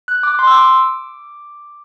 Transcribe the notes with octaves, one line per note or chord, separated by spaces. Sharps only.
F#6
D6
C6
E6
D6